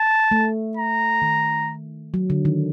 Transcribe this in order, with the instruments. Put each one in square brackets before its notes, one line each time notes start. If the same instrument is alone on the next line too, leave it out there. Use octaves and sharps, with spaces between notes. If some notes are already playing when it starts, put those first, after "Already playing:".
Already playing: [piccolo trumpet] A5
[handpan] A3
[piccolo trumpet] A#5
[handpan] D#3
F#3
D3
D#3